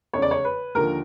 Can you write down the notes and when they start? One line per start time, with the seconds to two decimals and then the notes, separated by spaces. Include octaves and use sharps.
0.13 F1 E2 C#3 C#5
0.22 D5
0.31 C#5
0.44 B4
0.75 D#2 D3 F3 A#4